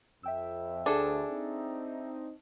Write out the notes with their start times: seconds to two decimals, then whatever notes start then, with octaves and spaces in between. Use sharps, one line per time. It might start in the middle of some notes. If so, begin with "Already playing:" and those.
0.23 F2 E5 G5 E6
0.86 D2 D4 G#4 A4
1.30 C4 D#4